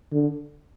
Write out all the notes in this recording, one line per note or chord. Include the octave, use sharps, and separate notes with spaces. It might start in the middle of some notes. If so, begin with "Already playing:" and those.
D3